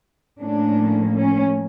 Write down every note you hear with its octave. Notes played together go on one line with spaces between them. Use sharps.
A2 F3 A#3 C#4 D4
C#4